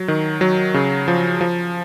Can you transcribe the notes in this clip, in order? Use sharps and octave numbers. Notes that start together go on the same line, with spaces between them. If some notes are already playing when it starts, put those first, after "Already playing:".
Already playing: F#3
D#3
F#3
C#3
F3
F3